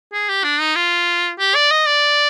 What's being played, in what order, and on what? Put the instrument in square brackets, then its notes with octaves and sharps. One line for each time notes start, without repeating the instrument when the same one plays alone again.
[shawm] G#4
G4
D4
D#4
F4
G4
D5
D#5
D5